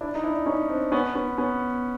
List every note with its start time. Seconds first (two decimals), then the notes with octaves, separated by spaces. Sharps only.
0.01 D4 E4
0.15 D#4
0.24 D4 E4
0.46 C#4 D#4
0.69 C4 D4
0.92 B3 C#4
1.15 B3 C#4
1.38 B3 C#4